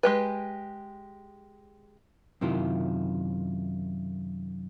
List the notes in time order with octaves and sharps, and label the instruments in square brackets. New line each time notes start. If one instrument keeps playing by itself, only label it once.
[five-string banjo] G#3 G4 B4
[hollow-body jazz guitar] F#2 C3 D#3 E4 F4